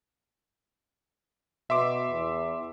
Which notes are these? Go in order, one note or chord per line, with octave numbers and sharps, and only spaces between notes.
B2 E5 C6 D6
E2